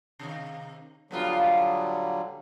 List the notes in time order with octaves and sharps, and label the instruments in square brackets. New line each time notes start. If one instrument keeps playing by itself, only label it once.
[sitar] C3 D#3
[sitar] A#2 B3 F4 [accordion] D3 F#3 G3